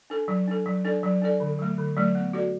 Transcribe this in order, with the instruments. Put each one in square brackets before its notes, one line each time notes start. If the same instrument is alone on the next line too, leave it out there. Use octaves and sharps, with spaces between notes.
[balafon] D4 A4
F#3
D4 A4
F#3
D4 A4 D5
F#3
D4 A4 D5
D3
F#3 A3
D3
F#3 A3
B3
F#4 A4 D5